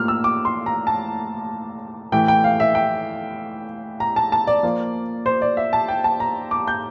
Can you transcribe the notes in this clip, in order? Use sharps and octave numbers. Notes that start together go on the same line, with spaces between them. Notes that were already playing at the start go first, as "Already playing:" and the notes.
Already playing: A2 F3 A#3 F6
E6
D6
C6
A#5
A5
A2 E3 A3 E4 G5
G5
F5
E5
G5
A#5
A5
A5
D5
F3 A#3 F4
C5
D5
E5
A5
G5
A5
A#5
D6
G6